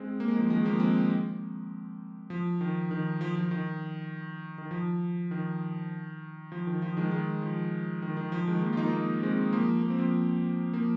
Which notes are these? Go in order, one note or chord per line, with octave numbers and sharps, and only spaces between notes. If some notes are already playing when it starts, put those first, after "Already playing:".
Already playing: G#3 C4
A#3
G#3
F3 A#3
D#3 G#3
F3 A#3
G#3 C4
F3
D#3
D#3
F3
F3
D#3
D#3
F3
D#3
F3
D#3
F3
D#3 G#3
D#3 G#3
F3
D#3
D#3
F3
D#3 G#3
F3 A#3
F4
A#3 D#4
A#3 D#4
G#3 C4
F3 A#3
A#3
C4
F3 A#3
F3 A#3